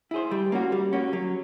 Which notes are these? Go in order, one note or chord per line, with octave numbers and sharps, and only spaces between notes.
E4 G#4 C5
G3
A#3 C#4 F#4
G3
A#3 C#4 F#4
F#3